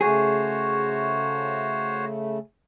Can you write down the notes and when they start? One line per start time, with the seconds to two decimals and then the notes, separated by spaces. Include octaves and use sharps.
0.01 C#3 A3 F#4 G#4 C5 C#5